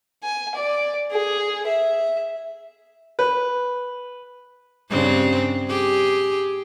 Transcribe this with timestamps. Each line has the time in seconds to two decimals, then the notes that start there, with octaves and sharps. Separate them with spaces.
0.23 G#5
0.55 D5
1.12 G#4
1.67 E5
3.19 B4
4.89 G2 C#3 C4
5.69 G4 G#4